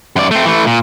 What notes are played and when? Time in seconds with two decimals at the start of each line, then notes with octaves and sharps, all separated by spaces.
0.16 F#2 D5
0.31 A3 C4
0.45 E3 A3
0.66 A#2